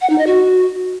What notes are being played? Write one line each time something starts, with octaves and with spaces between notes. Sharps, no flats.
F#5
D#4
D#5
F#4